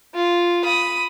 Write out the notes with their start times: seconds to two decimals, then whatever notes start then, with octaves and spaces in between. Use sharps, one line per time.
0.15 F4
0.64 B5 D#6